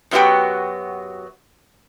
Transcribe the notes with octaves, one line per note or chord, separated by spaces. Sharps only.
F#2 F#3 B3 F#4 G4 G5